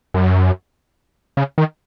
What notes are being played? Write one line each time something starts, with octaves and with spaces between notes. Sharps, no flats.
F#2
C#3
D#3